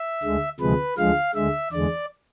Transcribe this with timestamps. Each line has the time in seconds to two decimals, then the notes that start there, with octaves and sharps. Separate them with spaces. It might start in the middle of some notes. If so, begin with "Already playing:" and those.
Already playing: E5
0.23 D2 D3 G#3
0.60 D2 C3 F3 G#3 B4
0.98 D2 D3 F3 G#3 F5
1.35 D2 D3 G#3 E5
1.72 E2 D3 G#3 D5